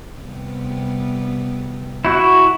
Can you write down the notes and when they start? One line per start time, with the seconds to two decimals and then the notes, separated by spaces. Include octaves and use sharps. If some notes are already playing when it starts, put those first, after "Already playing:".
0.18 C3 G3 B3
2.05 E4 F#4